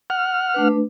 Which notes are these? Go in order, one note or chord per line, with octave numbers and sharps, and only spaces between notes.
F#5 F6
A3 D4 B4